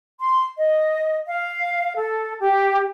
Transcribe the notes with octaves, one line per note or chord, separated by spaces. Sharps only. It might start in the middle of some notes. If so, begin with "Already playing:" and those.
C6
D#5
F5
A4
G4